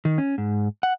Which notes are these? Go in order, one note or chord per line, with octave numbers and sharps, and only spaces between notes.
D#3
C#4
G#2
F#5